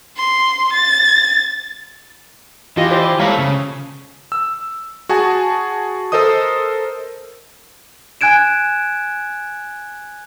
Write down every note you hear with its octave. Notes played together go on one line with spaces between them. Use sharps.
C6
A6
E3 F4 G4 D#5
G4 C5 D5
G#3 A3 A4 C#5 F5 A#5 B5
C#3
E6
F#4 G#4 G#5 A5
A4 A#4 C5 D#5 D#6
G#5 F#6 G#6 D7 E7